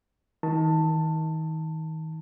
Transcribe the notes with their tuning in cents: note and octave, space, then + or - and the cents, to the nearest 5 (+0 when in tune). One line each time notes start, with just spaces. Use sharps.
D#3 +35 A5 +15